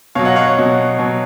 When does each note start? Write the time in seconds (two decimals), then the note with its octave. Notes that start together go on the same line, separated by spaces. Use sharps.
0.15 B2 F#3 C#5 F5
0.25 D#5 F#5
0.35 C#5 F5
0.46 D#5 F#5
0.58 B2 F#3
0.99 B2 F#3